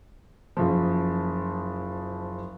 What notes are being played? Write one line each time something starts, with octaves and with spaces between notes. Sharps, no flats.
F#1 F3